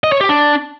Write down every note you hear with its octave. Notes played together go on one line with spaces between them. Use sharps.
D#5
C#5
G4
D4